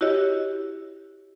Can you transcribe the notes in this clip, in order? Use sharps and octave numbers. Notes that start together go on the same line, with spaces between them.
E4 F#4 G4 C#5 D#5